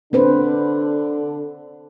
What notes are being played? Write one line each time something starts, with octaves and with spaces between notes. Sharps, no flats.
D3 C4 D4 B4 C5